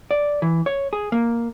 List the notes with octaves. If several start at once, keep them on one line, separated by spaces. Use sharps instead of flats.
D5
E3
C#5
G#4
A#3